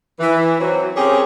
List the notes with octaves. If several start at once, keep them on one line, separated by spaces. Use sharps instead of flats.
E3
F#3 C4
C4 C#4 G4 G#4 A#4 C#5